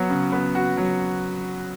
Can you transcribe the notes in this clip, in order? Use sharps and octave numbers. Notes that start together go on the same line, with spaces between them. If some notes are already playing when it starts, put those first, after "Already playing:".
Already playing: F#3 B3 F#4
C#3
B3
F#4
F#3